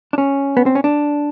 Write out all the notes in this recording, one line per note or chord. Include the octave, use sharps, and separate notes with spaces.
D4
C#4
B3
C4
C#4
D4